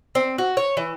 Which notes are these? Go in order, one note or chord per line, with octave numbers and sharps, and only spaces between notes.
C4
F#4
C#5
E3